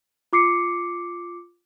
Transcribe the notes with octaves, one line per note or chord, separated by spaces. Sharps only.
F4 D6 C7 C#7